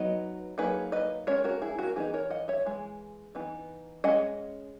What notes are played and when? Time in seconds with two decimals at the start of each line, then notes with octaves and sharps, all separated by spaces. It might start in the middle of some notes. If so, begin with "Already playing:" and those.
Already playing: F#3 B3 D#4 B4 D#5
0.58 F#3 A#3 D#4 G#4 B4
0.92 B4 D#5
1.27 G#3 C#4 A#4 C#5
1.44 F#4 A#4
1.62 E4 G#4
1.79 F#4 A#4
1.96 E3 B3 D#4 G#4 B4
2.14 A#4 C#5
2.30 D#5 F#5
2.48 C#5 E5
2.65 E3 G#3
3.35 E3 B3 D#4
4.04 G#3 C#4 D#5 F#5